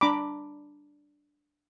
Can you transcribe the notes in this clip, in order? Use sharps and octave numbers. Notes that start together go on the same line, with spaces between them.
D4 A#5 B5 D6